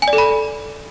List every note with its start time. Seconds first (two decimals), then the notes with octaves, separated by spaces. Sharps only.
0.02 G#5
0.08 D5
0.13 A4
0.18 B5